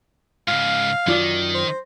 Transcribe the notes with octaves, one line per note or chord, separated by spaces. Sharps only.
G#2 C#3 F5
F#2 D#3 F4 D5
C5